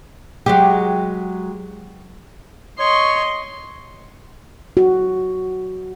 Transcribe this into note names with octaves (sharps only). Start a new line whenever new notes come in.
F#3 G#3 G4
C#5 D#5 C6 C#6
F#4